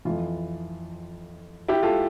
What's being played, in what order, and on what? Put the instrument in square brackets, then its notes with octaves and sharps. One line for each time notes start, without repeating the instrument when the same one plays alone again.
[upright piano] F2 E3 F4
E4 G4
F4 A4